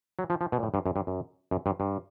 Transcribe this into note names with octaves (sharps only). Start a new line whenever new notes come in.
F#3
F3
F3
B2
A#2
A2
G2
F#2
G2
F#2
F#2
G2
G2